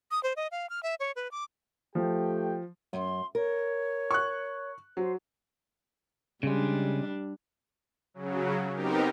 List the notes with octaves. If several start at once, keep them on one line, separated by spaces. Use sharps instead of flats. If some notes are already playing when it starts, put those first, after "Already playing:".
D#6
C5
D#5
F5
F6
E5
C#5
B4
D6
F3 A3 G4 G5
F#2 C6
A#4 C#5
C#6 F#6
F#3 C5
C#3 G3 G#3 D4
C#3 F#3
B3 C4 D#4 G4 A#4